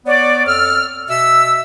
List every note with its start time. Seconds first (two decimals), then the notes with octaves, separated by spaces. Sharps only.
0.06 B3 C#5 D5
0.47 F2 E6 F6
1.08 B2 E5 E6